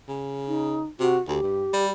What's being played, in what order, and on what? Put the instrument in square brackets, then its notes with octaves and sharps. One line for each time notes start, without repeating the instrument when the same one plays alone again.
[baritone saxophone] C#3
[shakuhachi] D#4
[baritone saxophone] C3 [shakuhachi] F#4
[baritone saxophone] D2 [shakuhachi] G4
[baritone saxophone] G2
G3